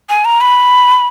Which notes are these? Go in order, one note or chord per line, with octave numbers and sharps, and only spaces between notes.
G#5
A#5
B5